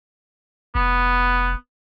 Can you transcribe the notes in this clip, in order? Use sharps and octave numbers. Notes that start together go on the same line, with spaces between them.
F1 B3